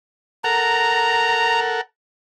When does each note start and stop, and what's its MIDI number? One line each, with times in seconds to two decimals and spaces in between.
0.44 1.81 69
0.44 1.81 70
0.44 1.81 78
0.44 1.60 82